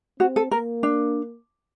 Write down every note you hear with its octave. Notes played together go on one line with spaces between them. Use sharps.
C4 F#4
A4
A#3 A#4
D4